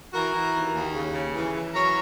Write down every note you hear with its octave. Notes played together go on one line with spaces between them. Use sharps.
E3 F#4 A#4
E3
D#2
D#2
C#3
C#3
E3
E3
F#3 A#4 C#5